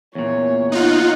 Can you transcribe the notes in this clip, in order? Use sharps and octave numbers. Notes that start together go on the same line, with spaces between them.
E2 A#2 C#5
D#4 F4 F#5